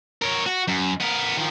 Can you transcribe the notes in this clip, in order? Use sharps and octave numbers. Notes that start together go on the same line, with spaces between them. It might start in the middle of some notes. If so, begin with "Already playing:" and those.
A#4 C#5
F#4
F#2
B3 A#4
D#3 F3